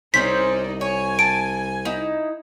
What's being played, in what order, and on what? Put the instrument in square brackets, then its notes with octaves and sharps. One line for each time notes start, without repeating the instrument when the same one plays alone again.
[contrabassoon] C2 [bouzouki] C4 C#4 C5 [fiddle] D#4 D5 [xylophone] B6
[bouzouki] C#5 [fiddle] G#5
[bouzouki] A5 [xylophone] D7
[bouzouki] D#4 E4